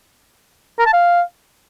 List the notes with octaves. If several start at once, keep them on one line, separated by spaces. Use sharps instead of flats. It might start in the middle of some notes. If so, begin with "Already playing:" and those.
A#4
A5
F5